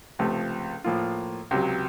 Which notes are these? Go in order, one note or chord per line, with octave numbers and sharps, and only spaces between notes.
C#2 C3 F3 A3
A2 F3 A#3 F4
C#2 C3 F#3